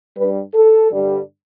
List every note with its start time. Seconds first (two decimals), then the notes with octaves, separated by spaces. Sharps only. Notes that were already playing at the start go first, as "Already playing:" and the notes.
0.14 G2 G3 B4
0.53 A4
0.92 G2 D3 G3